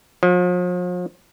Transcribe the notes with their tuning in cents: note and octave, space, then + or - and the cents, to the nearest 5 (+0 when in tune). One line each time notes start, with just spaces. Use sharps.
F3 +40